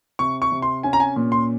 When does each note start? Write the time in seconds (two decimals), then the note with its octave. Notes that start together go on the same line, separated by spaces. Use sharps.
0.19 C3 C#6
0.42 C#6
0.52 C3
0.62 C6
0.83 C#4 G#5
0.93 A#5
1.00 G#5
1.16 A#2
1.32 C6